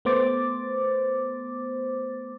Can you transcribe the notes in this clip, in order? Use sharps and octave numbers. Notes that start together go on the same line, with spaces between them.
A3 B3 C5 D6 A6